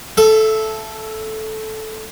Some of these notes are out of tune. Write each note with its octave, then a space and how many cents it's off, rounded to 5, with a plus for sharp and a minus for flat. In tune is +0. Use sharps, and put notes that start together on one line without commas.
A4 -10 E5 +25